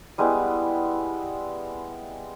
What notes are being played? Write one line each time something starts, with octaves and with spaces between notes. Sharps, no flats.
G3 G#3 B3 E4